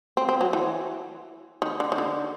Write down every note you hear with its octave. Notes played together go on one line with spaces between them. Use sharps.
C4
C4
F#3
E3
D#3
D3
D#3
D3